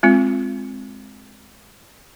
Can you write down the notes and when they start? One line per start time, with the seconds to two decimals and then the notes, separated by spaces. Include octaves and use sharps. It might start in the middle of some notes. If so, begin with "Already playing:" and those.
0.03 G#3 C4 F4